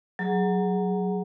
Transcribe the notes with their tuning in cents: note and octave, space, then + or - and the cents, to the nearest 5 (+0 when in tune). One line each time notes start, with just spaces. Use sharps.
F#3 +0 G#4 +0 A#5 +0